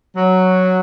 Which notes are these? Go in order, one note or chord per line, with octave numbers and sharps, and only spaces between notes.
F#3